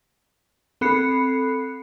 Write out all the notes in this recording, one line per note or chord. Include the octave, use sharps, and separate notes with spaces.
C4 A4 B5 F#6 C7 C#7